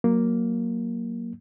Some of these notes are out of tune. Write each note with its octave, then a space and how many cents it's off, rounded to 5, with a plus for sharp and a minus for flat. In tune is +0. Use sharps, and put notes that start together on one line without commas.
F#3 +0 A#3 +0